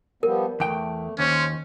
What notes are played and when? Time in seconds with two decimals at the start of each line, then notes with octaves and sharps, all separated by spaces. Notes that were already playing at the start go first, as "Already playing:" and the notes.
0.23 F3 G3 B3 A#4
0.60 E2 A3 G5
1.19 D#2 C#4 C5